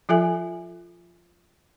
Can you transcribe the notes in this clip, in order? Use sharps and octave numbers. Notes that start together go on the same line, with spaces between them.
F3 F4 A4 E5 G#5